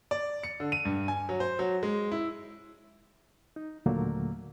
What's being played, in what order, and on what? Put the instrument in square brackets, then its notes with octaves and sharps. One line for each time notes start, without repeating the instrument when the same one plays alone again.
[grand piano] D5
C#7
D3
D#7
G2
G#5
F#3
C5
F#3
G#3
E4
[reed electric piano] D#4
D#2 A#2 D3 F#3 A3 A#3